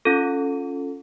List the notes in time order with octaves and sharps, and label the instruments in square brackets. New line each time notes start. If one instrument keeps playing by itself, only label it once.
[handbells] C#4 F4 A4